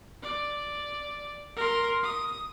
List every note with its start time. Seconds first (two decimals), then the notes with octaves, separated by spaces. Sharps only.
0.23 D5
1.56 A#4 C6
2.03 D#6